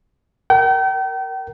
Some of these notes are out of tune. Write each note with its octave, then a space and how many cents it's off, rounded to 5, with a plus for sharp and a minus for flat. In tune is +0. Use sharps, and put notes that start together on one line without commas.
A#4 +0 G5 -35